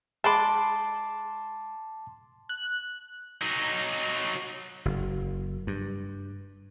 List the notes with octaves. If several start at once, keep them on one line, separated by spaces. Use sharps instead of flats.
G#3 A5 B5 C6 D6
F#6
F#3 D#4
F#1
G2